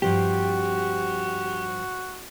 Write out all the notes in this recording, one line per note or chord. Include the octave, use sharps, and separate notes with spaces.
G2 F3 C4 F#4 G4